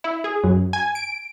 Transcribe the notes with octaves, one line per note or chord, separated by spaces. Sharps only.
E4
G#4
F#2
G#5
D7